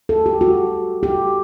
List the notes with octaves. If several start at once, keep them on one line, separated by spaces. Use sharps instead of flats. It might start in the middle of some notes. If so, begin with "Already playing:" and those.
A4
G4
F#4
G4